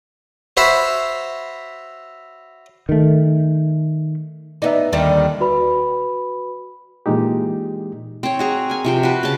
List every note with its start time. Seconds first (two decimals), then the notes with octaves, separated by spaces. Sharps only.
0.57 F#4 C5 C#5 E5 B5
2.89 D#3 A3
4.62 B3 D#4 D5 E5
4.92 D#2 D3 D#3 G3
5.40 F#4 B4 B5
7.06 A#2 E3 G#3 D#4 G4
8.23 C4 C#5
8.39 F#4 G#4 A#5
8.70 A#4 G#5
8.84 C3 F3 G5
9.03 F#4 B4
9.23 C#3 A5